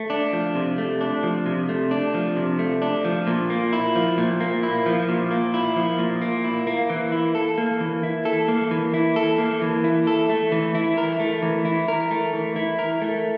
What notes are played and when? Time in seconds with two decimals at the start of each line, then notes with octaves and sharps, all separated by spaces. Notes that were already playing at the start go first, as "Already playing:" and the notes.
Already playing: A3
0.10 D4
0.33 F3
0.55 C3
0.78 A3
1.01 D4
1.23 F3
1.46 C3
1.69 A3
1.91 D4
2.14 F3
2.36 C3
2.59 A3
2.82 D4
3.05 F3
3.27 A#2
3.50 A#3
3.73 E4
3.95 F3
4.18 A#2
4.40 A#3
4.63 E4
4.86 F3
5.09 A#2
5.31 A#3
5.54 E4
5.76 F3
5.99 A#2
6.21 A#3
6.44 E4
6.67 A#3
6.90 E3
7.12 E4
7.35 A4
7.58 A#3
7.81 E3
8.03 E4
8.25 A4
8.48 A#3
8.71 E3
8.94 E4
9.16 A4
9.38 A#3
9.61 E3
9.84 E4
10.07 A4
10.29 A3
10.52 E3
10.75 E4
10.97 A#4
11.20 A3
11.42 E3
11.65 E4
11.88 A#4
12.11 A3
12.33 E3
12.56 E4
12.79 A#4
13.02 A3